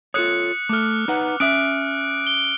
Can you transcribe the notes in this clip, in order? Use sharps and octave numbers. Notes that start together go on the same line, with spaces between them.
F4 A4 C#5 D#6 F#6 C#7
A3 A4 D6 F6
D#4 B4 F#5
C#4 E5 D#6 F#6 D7
G7